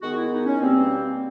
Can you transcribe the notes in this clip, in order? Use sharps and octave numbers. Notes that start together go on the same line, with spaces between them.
D#3 G#3 B3 F#4
E4
D#4
C#4
B2 G3 A#3 C4